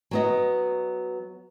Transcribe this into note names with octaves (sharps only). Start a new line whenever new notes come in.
F#3 B3 D#5